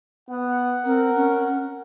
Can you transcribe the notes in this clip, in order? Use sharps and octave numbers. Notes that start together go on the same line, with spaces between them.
B3 F#5
C4 A#4
C#4